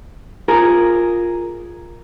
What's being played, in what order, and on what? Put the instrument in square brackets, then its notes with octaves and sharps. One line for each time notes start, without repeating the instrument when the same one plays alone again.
[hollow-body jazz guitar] F4 G#4 A#4